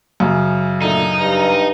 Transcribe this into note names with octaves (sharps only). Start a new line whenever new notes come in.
F#2 C#3
A#2 D3 A3 D#4
G2